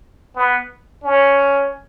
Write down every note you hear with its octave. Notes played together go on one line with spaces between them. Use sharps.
B3
C#4